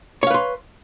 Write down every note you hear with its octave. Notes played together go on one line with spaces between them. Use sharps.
B4 C#5 F5 C6